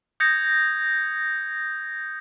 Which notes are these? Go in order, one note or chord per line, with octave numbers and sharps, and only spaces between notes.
D#6 G6 G#6 A#6 C#7